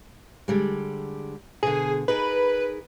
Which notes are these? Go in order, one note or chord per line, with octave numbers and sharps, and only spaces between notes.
D3 G3 G#3
B2 D3 G#4
D#4 G#4 A#4 B4